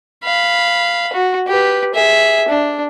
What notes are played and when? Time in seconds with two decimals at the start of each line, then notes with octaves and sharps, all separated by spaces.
0.24 F5 B5
1.13 F#4
1.48 G4 B4
1.94 G#4 E5
2.48 D4